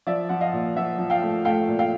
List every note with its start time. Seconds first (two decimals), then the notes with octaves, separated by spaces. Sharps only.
0.07 F3 D5 E5
0.29 F3 F#5
0.41 D#5 F5
0.53 A#2
0.76 F3 E5 F#5
0.98 F3
1.10 F5 G5
1.22 A3
1.45 A3 F5 G5
1.67 A#2
1.79 F5 G5